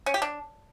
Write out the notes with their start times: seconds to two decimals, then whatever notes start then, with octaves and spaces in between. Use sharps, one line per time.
0.06 C#4
0.14 G4
0.22 D4